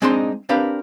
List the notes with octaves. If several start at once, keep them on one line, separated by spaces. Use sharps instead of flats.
G#3 C4 D4 D#4 D#5 C6
C4 D4 G4 A#4 B4 F5